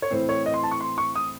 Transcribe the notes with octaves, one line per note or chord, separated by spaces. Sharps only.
C#5
A2 E3 C4 C5
C#5
D#5
C6
A5
C#6
C6
C#6
D#6